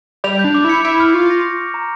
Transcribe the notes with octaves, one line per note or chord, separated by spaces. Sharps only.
G3 F7
G6
D4
D6
E4
C#7
E4 D7
F6
F4 C#6
A#6
A#6
D6
A#5